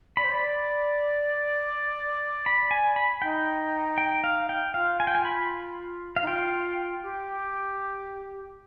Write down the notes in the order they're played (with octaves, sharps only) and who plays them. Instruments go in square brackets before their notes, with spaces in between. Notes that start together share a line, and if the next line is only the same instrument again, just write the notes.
[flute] D5 [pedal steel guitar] B5
[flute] C5
D5
[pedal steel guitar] B5
G#5
B5
[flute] D#4 [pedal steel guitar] G5
[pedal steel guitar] G5
F5
G5
[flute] F4 [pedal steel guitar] F5
[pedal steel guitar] G#5
G5
G#5
B5
F5
[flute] D#4
[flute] F4 [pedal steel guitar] G5
[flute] G4